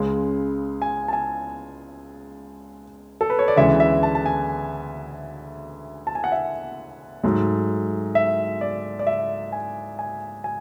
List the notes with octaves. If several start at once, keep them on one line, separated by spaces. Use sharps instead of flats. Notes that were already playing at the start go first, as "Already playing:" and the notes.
Already playing: C#2 C#3 G#3
G#5
A5
G#5
A4
B4
C#5
D5
D2 C#3 E3 G#3 E5
E5
A5
A5
G#5
A5
G#5
F#5
E5
G#2 F#3 A3
E5
D5
D5
E5
G#5
G#5
G#5